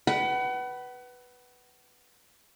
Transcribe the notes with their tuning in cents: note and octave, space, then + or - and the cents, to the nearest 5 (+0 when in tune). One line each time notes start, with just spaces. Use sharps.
B4 +0 F#5 +35